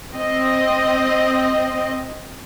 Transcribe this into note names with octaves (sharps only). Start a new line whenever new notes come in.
C4 D#5